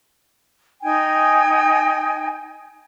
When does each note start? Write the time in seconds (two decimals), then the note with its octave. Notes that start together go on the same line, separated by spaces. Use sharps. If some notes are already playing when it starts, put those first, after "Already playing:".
0.82 D#4 G5 G#5